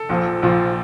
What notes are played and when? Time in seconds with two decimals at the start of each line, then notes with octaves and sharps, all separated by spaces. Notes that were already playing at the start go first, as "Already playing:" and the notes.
Already playing: A4
0.09 A#1 A#2 F3
0.42 A#1 A#2 F3